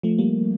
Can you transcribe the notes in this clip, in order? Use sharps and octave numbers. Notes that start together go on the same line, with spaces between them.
F3 A3
G3 A#3